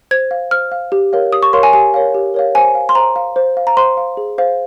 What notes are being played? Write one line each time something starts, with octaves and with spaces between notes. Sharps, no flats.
C5 G#6
F5
C5 F6
F5
G4
A#4 C#5 F5
G4 D#6
C#6
A#4 C#5 F5 C6
G#5
G4 G#5
A#4 C#5 F5
G4
A#4 C#5 F5
C5 G#5
F5
C6
C5 A#5
F5
C5
F5
A#5
C5 C6
F5
G#4
C5 F5